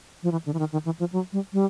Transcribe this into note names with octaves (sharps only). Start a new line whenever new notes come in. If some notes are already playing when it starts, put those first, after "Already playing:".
F3
E3
D3
E3
D#3
D#3
E3
F3
F#3
G3
G3